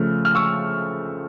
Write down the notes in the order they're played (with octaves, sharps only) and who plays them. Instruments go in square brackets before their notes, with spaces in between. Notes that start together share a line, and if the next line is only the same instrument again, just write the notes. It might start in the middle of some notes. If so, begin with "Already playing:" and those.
Already playing: [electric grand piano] C#3 F3 A3 [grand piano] F6
[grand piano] F6
C#6 E6